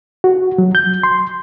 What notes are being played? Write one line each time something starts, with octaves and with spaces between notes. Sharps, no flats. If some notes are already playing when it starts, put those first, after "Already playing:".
F#4
F#3
G6
C6